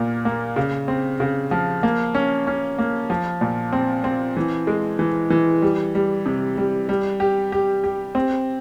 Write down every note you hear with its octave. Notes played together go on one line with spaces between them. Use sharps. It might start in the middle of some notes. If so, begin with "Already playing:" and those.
Already playing: A#2 A#3
A#3
C#3
C4
C#3
F3
A#3
C#4
C#4
A#3
F3
A#2
C4
C4
E3
G#3
E3
E3
G3
G3
C3
G3
G3
G4
G4
G4
C4